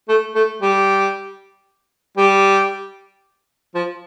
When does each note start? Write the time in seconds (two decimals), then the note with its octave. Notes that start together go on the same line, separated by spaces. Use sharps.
0.08 A3
0.35 A3
0.62 G3
2.17 G3
3.74 F3